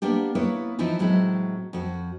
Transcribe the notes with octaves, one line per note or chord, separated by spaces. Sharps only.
A#3 B3 D4 G4
A#3 B3 E4 B4 C#5
E3 F3 B3 D#4 E4
A2 F#3 G#3 C4 E4
F2 F#4